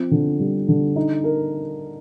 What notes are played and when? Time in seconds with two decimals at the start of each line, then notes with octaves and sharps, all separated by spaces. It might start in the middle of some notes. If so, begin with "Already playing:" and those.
Already playing: F3 C4
0.11 D3
0.40 G3
0.68 D3
0.96 D#4
1.24 A#4